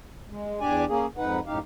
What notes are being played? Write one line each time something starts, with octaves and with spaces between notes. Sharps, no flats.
G#3
E2 D4 G4 D5 G#5
A#3 C#4 G#4
F2 G#2 D#4 B4 F#5
F#2 A2 D#4 G4 F5